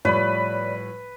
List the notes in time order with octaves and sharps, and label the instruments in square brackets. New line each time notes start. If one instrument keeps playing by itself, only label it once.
[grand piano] A2 F3 G3 [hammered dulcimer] B4 [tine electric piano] C#5 D5 B5